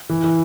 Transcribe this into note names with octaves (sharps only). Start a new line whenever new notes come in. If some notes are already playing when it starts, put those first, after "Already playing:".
E3
E3